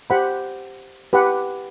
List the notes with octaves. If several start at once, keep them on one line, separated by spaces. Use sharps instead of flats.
G4 C5 F#5 B5
G4 B4 F#5